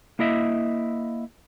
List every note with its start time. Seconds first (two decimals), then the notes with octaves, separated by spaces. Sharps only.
0.19 A#3 E4 D#5 E5